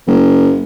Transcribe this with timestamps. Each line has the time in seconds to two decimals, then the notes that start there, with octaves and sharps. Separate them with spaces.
0.07 F#1